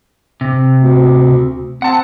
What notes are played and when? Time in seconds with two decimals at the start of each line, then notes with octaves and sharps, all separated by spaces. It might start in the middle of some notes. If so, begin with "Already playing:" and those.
0.41 C3
0.80 D2
1.82 C4 F#5 A5